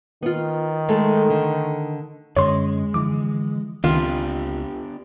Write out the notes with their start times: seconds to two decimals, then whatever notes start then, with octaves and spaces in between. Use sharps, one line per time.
0.22 D#3 B3 F4
0.89 G#3 A3 A4
1.30 D3
2.36 F#2 D3 G#3 C#4 C#5 C6
2.94 D3 E3 F3 D6
3.84 C#2 D#3 B3 C4 D4 F4 G4